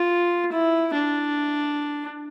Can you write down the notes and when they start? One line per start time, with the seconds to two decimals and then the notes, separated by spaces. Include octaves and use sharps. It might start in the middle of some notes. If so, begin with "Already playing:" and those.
Already playing: F4
0.52 E4
0.95 D4